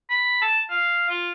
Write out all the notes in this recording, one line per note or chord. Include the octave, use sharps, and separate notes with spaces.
B5
A5
F5
F4